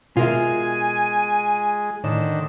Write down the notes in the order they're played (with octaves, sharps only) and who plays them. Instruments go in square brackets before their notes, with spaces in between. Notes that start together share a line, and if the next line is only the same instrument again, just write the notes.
[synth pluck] B2 [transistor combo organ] G#3 [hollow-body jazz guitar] F4 A#4 E5 [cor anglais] G#5
[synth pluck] A2 E7 [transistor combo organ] D3 D#3